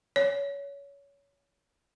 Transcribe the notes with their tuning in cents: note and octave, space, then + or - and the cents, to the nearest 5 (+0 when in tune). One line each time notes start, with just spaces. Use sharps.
C#5 +20